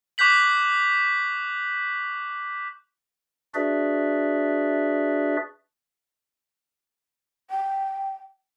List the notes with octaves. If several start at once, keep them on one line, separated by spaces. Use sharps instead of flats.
C#6 D6 F#6 G6 B6 F#7
D4 F#4 G#4 B4 D5 E5
G5